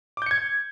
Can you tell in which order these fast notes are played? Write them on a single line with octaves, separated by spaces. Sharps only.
D6 G6 C#7 G#6